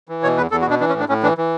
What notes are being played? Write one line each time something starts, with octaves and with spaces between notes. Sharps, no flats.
E3
B2 C#5
E2 B4
E2 A4
F#4
B2 D4
E3 D4
C#4
A2
D4
A2 C#4
E3 D4
E3